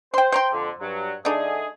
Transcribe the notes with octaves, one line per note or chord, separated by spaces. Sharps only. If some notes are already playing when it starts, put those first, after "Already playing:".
C5 G5 C6
C5 G5 A#5 C6
F2 D3
G2 F#3
D3 A3 D4 D#4 G#4